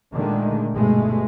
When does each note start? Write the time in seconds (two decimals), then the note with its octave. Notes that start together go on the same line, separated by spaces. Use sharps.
0.14 A#2 D3 D#3 G#3 A3
0.74 G1 B2 G#3 A3